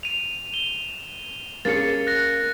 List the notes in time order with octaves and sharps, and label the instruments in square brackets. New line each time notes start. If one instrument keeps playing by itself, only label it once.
[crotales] D#7 F7
E7 G7
[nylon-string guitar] A#3 C#4 G#4 [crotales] A6 C#7
[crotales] F#6 A#6